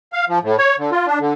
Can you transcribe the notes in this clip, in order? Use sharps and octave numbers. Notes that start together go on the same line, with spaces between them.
F5
F3
A2
C#5
D3
F4
D4
D3